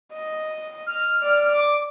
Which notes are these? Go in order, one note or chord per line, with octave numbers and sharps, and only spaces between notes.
D#5
F6
D5
D6